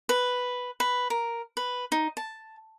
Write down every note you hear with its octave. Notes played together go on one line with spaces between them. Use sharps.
B4
B4
A#4
B4
D#4
A5